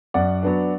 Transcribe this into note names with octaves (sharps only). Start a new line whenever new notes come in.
F#2 D5 F#5
F#3 B3 D4